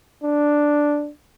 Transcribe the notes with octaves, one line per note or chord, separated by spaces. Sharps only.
D4